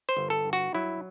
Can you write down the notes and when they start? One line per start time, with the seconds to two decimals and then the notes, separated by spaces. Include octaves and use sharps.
0.09 C5
0.17 G1
0.30 A4
0.45 G2
0.53 F#4
0.74 F#3 E4